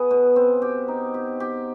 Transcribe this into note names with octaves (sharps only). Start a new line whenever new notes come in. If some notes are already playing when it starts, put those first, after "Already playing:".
Already playing: B3 G#4
B2
C4
G4
D#4
G4
G4